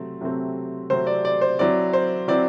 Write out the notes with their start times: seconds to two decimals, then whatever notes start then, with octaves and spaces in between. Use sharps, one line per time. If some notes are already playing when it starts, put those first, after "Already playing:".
Already playing: C3 F#3 A3 C4
0.21 C3 F#3 A3 C4
0.90 C3 F#3 A3 C4 C5
1.07 D5
1.25 D5
1.41 C5
1.59 F#3 C4 E4 D5
1.93 C5
2.28 F#3 C4 E4 D5